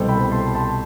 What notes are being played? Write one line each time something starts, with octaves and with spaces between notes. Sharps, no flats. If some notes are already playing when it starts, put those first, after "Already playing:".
Already playing: C2 B2 G3 A4 C5
G5 B5
A5 C6
A5 C6